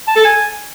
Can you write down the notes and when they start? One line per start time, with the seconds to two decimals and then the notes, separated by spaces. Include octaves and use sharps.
0.08 A5
0.16 A4
0.25 G#5